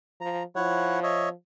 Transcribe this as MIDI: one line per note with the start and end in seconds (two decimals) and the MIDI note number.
0.21 0.43 53
0.21 0.43 82
0.56 1.32 53
0.56 1.00 64
0.56 1.00 73
0.56 1.00 78
1.03 1.29 73
1.03 1.29 75
1.03 1.29 76